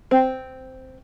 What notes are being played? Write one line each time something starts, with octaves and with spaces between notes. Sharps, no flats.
C4